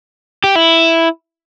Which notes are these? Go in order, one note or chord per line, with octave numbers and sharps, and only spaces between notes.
G4
E4